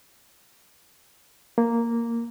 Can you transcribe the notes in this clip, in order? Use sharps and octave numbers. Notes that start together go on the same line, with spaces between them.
A#3